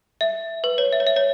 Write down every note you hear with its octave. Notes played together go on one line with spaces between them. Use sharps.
E5
B4
C#5
E5
C#5
E5
C#5